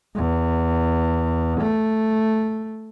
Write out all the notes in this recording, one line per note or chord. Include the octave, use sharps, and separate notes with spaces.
E2
A3